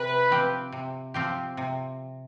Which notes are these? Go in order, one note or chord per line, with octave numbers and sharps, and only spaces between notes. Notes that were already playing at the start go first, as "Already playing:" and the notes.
Already playing: C3 B4
F3 C4 G4
C3
F3 C4 G4
C3